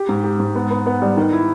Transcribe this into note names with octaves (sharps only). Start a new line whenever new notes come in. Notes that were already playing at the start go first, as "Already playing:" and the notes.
Already playing: G4
G#2
G4
G#2
B3
B3
B3
G3
D#3
E4